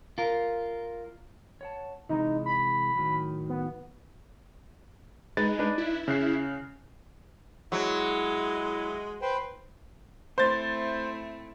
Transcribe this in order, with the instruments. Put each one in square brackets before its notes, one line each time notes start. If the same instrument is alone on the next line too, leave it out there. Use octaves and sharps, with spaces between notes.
[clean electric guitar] F4 A#4
[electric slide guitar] C#5 F#5 A5
[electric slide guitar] C3 E3 G#3 [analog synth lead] D#4
[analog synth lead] B5
[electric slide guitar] A2 D#3 F#3
[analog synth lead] B3
[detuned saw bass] G#3 [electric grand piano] D#4 B4 A6
[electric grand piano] D4 D#4 B4
[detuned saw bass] E4
[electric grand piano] C#3 F#6 C7
[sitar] F#3 [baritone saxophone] G#3 [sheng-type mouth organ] E4
[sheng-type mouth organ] B4 C5 G5
[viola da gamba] A3 C4 E4 [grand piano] C5 A6